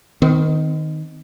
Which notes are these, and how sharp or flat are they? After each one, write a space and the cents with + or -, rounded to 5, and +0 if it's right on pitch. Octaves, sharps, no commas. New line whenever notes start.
D#3 +0 C4 -45